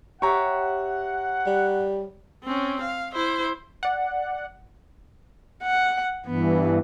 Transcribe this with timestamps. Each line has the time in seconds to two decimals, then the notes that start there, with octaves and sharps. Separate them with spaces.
0.22 G4 C#5 E5 F#5 A#5 C#6
1.47 G3
2.44 C4 C#4
2.81 F5
3.12 E4 C5
3.83 D5 F#5
5.63 F#5
6.26 G2 E3 B3